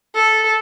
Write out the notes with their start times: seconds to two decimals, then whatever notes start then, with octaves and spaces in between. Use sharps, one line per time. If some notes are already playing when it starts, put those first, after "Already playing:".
0.15 A4